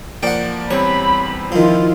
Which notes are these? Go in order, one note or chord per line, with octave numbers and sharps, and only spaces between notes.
F3 A#3 D5 F#5 G5
E2 G3 C4 C#5 B5
D#3 F3 E4 F4